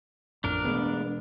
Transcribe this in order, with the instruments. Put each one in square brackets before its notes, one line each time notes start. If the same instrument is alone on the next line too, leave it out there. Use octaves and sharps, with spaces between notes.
[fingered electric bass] A1 F2 [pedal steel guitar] D4 A#4
[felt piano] E1 G#4 [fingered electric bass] A3 B3